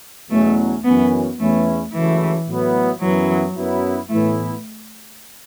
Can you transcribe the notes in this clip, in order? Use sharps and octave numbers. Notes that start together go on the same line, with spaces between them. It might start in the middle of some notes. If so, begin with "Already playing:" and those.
E2 B2 F#3 A3 C#4
F#2 E3 B3 C#4
E2 E3 A3 C#4 E4
C#2 C#3 E3 F#3 A3 E4
A2 F#3 B3 E4
F#2 E3 F#3 B3 E4
F#2 F#3 B3 E4
A2 E3 A3 B3 E4